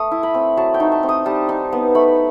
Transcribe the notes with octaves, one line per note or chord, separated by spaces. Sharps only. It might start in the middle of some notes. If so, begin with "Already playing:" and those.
Already playing: A3 D#6
E4
B5
C4
F#3 A5
G5
D#4
A5
C4
D#6
G3 A5
D#4
B3
A3 B5